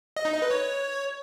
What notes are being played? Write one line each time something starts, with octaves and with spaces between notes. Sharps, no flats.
D#5
D#4
D#5
B4
C#5